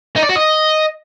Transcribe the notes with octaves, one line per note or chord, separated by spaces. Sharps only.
D#4
D5
F#4
D#5